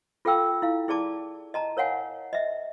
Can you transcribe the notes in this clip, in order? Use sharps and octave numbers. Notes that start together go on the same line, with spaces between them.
F4 A4 F5 G5 E6
E4 F5
E4 G#4 D5 A5 D6
D#5 A5 A#5
A#4 C#5 F5 F#5 G#5
D#5 E5